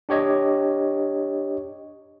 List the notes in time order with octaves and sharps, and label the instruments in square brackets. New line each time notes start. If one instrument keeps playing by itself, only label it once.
[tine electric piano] D4 G4 C#5 D#5